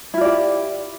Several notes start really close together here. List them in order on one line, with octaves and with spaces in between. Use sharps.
E4 F4 D5 G4